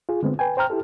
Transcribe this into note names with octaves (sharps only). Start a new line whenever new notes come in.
F4 G#4
D3 G#3 B3 C4
B4 G5 G#5
C5 G5 A#5 F6
E4 G4 A4